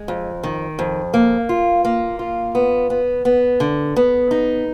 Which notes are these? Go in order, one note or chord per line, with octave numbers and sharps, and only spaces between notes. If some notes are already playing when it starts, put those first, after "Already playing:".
Already playing: G#3
F2
D#3
F2
A#3
F4
A#3
F4
B3
B3
B3
D3
B3
D#4